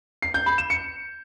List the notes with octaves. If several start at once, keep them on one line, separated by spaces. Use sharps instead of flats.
C7
G6
B5
E7
C#7